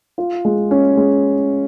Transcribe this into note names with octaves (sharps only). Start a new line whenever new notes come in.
F4
G#3
C#4
G#3